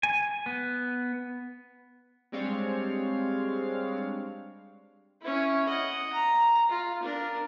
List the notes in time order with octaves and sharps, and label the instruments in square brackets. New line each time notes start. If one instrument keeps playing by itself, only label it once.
[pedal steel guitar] G#5
B3
[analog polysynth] G3 G#3 C4 D4 C#5 F5
[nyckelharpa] C#4 E4
D#5 F#5
A#5
F4
D4 A#4